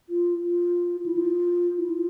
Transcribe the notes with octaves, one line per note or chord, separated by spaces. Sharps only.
F4
F4
E4
F4
E4
F4